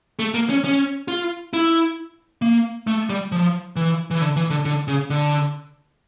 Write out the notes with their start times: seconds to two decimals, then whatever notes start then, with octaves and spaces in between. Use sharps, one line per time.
0.19 A3
0.34 A#3
0.49 C#4
0.64 C#4
1.08 F4
1.53 E4
2.42 A#3
2.87 A3
3.10 G3
3.32 F3
3.76 E3
4.11 E3
4.21 D3
4.36 E3
4.50 D3
4.65 D3
4.88 C#3
5.10 D3